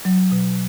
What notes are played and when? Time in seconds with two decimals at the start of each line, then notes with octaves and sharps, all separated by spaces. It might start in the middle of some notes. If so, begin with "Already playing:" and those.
0.05 F#3
0.32 B2